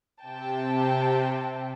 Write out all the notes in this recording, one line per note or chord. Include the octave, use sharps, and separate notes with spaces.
C3 G5 A5